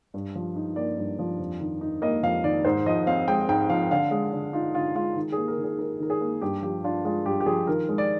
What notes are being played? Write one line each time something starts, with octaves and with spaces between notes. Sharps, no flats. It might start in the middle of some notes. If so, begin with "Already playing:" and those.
G2
F3
D#4
A#3 D5
G2
F3
F2
D#3
D#4
A#3 D#5
F2 F5
D#3 D5
G#2 C5
F3 D#5
C4 F5
G#3 G5
G#2 G5
F3 F5
D3 F5
G#3
D3
D#4 F4
D3 F4
G#3 F4
D#3
A#3 G#4
A#4
D#3
G#4
D#4 A#4
D#3 A#4
G#4
A#3
G2 G4
F3 G4
D4 F4
G#3 F4
G2 G4
G4
F3 G#4
D#3 A#4
G#3
D5